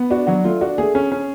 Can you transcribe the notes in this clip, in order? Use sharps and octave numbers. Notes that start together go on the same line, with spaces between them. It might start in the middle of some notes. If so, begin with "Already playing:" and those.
Already playing: B3
D4 F#4
F#3 F#4
A3 F4
D4 F#4
A3 G#4
C#4
C#4